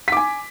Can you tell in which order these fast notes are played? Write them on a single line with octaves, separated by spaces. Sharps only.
B6 D6 G#5